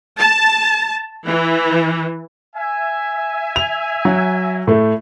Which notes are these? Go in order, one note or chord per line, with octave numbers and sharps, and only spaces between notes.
A5
E3
E5 G#5
F7
F#3
A2 A3